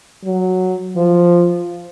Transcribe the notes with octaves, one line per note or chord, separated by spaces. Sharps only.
F#3
F3